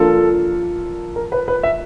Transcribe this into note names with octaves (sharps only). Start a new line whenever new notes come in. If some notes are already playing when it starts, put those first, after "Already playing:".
Already playing: F3 A#3 D4 F4 A4
A#4
B4
B4
E5